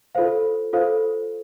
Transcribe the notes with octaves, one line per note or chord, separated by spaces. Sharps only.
F4 A4 C5 F5
F4 A4 C5 F5